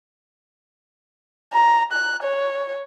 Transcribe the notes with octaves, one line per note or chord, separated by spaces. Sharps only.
A#5
F#6
C#5